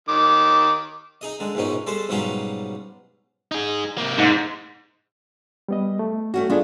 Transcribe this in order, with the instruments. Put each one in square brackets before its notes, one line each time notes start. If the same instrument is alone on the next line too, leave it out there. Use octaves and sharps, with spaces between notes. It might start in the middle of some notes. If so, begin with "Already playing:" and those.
[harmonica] D#3 D6
[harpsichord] D#4 G#4 D#5
D3 G#3
A#1 G#2 B2 C#4 D#4
G3 G#3 A4 C5
G#2 B2 F#3 G3 C#4 F4
[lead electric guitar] D#4 G#4
C3 A#3
[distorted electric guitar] G#2
[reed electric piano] G3 B3 D#5
A3
[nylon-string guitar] A3 C#4 F#4
[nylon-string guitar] B3 D4 [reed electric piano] F4 G#4